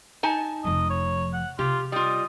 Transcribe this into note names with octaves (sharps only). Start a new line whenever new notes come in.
D#4 G#5 A5
F1 F3 D#5
C#5
F#5
C3 F4 G4
G3 F4 D#5